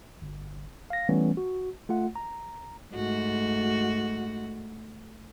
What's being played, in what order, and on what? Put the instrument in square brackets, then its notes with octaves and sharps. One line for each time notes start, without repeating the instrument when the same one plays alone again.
[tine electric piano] G1
F5 A#6
E3 G3 A3 B3 C#4
F#4
A3 F4 F#5
A#5
[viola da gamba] G#2 A3 F#4